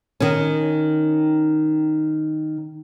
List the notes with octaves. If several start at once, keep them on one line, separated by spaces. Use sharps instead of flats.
D#3 C#4